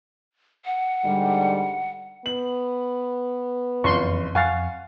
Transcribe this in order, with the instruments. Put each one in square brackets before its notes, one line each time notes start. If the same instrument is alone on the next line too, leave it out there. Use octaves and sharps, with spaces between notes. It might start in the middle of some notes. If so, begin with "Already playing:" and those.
[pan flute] F#5
[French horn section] G#2 D3 G3
[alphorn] B3 [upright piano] F#7
[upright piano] F#1 F4 [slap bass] F2 E3 C4 [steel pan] C6 C#6
[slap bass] F2 [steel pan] F5 F#5 [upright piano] G#5 C#6 A6